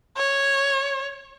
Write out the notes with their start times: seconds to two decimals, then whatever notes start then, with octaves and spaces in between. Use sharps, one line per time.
0.17 C#5